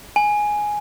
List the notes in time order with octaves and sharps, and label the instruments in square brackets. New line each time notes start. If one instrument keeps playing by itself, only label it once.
[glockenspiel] G#5